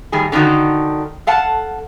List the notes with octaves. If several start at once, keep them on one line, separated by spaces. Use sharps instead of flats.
A2 D#3 G3 G#4
D3 D#3 D4 D#4 F#4
A4 F5 F#5 A5